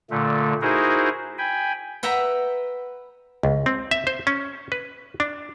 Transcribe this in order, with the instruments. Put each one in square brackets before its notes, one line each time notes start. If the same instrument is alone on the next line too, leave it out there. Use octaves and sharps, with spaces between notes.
[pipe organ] A#2 D3 A3
D#4 E4 F#4 G#4 A#4 C5
G5 G#5 B5
[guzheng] B4 E5 F#5 G5 A#5 B5
[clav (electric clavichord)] C#2
C4
E5
C5
C#4
B4
D4